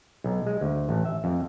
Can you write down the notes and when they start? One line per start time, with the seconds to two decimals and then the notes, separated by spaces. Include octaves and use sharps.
0.24 B1
0.46 G#3
0.61 D2
0.89 A1
1.05 E5
1.24 F2